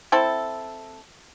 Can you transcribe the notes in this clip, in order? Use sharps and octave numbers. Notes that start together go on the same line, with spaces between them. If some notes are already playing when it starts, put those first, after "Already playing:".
C4 E4 A4